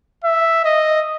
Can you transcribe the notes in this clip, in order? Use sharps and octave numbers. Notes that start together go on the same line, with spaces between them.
E5
D#5